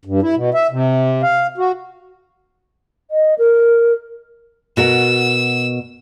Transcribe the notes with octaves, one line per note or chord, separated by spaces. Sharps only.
G2
E4
B2
E5
C3
F5
F#4
D#5
A#4
B2 F#4 A#4 E6